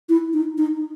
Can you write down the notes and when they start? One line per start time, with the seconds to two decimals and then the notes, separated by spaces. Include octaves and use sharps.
0.09 E4
0.33 D#4
0.58 D#4